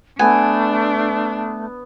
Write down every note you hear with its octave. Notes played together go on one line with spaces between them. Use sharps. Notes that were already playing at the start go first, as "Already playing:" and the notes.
A3 B3 D4 G#5